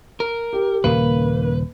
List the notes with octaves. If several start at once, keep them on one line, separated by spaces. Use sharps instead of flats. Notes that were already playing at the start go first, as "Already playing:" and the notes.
A#4
G4
D#1 C#3 A#3 B4